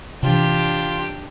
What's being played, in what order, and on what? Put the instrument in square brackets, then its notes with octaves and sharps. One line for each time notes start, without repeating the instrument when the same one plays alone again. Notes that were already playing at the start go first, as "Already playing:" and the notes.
[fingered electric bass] C3 E3 [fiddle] D4 G4 [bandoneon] F4